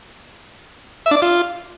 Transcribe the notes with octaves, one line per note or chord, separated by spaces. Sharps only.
E5
D4
D5
F4